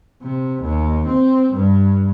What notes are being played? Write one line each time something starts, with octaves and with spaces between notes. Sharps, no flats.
C3
D#2
C4
G2